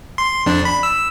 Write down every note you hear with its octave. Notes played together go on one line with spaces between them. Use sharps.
C6
F2 D4
B5
E6